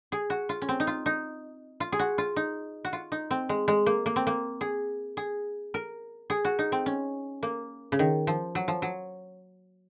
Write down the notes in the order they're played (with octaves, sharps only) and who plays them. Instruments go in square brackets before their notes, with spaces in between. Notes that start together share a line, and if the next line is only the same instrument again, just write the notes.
[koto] G#4
F#4
F4
C#4
C4
D#4
F4
D#4
F4
G#4
F#4
F4
D#4
F#4
F4
D#4
C4
G#3
G#3
A#3
A#3
C4
A#3
G#4
G#4
A#4
G#4
F#4
D#4
C4
C#4
A#3
C#3
D#3
F3
F#3
F3
F#3